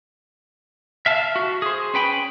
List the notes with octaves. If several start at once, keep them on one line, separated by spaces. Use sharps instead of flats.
E5 F5 A5
F#4
G#4 C5
C#4 B4 G5 B5